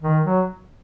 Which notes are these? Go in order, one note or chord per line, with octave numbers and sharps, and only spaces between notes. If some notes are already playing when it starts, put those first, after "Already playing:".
D#3
F#3